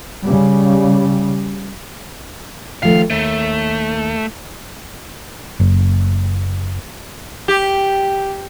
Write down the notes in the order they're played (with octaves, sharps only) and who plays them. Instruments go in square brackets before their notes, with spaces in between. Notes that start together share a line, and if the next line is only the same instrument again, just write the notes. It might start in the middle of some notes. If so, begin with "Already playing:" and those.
[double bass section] C#3 G3
[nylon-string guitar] D#3 F3 A3 [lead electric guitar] F5
[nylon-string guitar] D#2 [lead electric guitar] A3
[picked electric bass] F#1
[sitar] G4